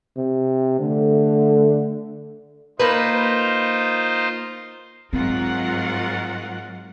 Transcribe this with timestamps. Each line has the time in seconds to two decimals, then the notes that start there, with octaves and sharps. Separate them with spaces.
0.17 C3
0.79 D3 A3
2.80 A#3 D#4 F4 B4 C5
5.13 G#2 F#3 C4 F4 A#4 F#5